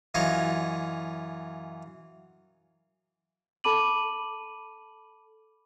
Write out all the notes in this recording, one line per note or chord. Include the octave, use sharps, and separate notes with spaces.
F#2 E3 F4 C#5 D#5
A4 A5 B5 D6 D#7 F#7